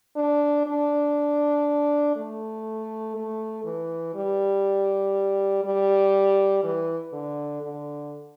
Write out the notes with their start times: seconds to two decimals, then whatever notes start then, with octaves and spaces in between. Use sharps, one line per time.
0.16 D4
0.66 D4
2.16 A3
3.16 A3
3.64 E3
4.14 G3
5.64 G3
6.64 E3
7.13 D3
7.62 D3